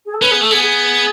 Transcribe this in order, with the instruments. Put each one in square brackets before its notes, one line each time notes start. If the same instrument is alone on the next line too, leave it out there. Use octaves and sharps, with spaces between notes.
[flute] G#4
A4
[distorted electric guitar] C#4 [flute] B4
[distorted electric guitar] B3 [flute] G#4
[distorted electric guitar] A3 [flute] A4
[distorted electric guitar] B3 [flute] G#4
[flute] G#4